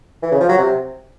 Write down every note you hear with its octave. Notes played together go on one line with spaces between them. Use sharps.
E3
C#3
F3
F#3
C3